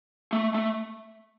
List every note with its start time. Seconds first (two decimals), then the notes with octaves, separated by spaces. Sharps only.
0.33 A3
0.54 A3